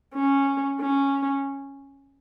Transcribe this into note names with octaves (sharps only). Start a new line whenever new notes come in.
C#4
C#4